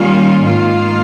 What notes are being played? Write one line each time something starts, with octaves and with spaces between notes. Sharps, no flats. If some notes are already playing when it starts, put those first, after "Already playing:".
Already playing: D#3 G3 A#3 C#4 F4
G#2 D#3 A#3 F4